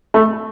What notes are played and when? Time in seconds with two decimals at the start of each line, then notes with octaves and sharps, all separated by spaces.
0.14 A3